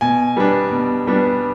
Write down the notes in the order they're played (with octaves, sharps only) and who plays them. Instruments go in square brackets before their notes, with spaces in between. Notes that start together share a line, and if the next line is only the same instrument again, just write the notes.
[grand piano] B2 G#5
G3 B3 D4
B2
G3 B3 D4